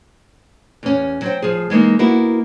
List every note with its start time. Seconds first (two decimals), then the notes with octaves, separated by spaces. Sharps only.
0.83 E2 C#4
1.22 F#3 C5 G5
1.42 F3 G#4
1.70 E3 G#3 A#3 D#4
1.99 A#3 B3 E4 F#4